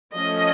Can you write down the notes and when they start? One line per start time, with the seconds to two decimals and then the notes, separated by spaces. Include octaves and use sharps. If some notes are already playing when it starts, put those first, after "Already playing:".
0.14 F3 A3 C#4 D#5